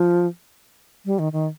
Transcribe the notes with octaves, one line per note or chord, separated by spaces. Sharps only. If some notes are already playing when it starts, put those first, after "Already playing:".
Already playing: F3
G3
D#3
D#3